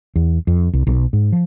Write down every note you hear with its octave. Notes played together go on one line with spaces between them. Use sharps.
E2
F2
C2
B1
G#2
F3